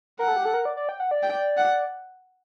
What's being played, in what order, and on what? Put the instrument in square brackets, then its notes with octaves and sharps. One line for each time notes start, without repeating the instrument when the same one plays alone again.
[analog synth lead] A#4 [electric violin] F#5
[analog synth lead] A4
G4
A4
A#4
D5
D5
G5
F#5
D5
[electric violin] G5
F#5